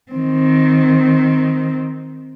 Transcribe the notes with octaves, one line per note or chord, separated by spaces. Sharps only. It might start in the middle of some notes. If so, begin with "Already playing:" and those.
D#3 C4